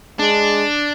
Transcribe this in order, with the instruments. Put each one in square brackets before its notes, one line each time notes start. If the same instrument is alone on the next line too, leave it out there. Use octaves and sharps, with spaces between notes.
[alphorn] G#3 [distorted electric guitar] D4